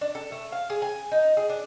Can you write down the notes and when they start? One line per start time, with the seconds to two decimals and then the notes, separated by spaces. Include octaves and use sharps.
0.01 D4
0.15 A4
0.32 A3
0.52 F5
0.70 G#4
0.82 G#5
1.12 D#4
1.37 G#4
1.50 D4